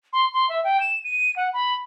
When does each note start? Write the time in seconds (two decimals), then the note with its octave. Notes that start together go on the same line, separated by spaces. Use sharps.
0.13 C6
0.33 C6
0.49 E5
0.64 G5
0.80 E7
1.04 D#7
1.36 F#5
1.53 B5